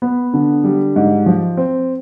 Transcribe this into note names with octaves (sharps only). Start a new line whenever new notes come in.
B3
D3
G3
G#2
F3
C4